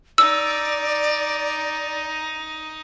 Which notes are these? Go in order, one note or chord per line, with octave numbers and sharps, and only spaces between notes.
D#4 D5 E6